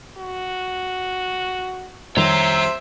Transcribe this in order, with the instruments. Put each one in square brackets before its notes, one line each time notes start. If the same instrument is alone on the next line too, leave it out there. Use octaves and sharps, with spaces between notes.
[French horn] F#4
[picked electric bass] F2 D#3 G3 [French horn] C3 [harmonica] C5 E5 [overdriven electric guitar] C#5 A#5